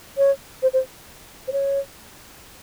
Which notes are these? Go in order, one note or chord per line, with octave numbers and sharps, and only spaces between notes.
C#5
C5
C5
C5
C#5